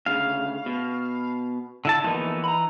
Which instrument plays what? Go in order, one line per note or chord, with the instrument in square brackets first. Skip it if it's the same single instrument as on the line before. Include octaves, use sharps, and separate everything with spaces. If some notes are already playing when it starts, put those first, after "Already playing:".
[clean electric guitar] D2 C#3 [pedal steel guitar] F5
[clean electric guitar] B2
[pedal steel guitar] D3 E4 A5
[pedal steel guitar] E3 D#4 [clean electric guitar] F3 A#3 B3
[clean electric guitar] A#5 B5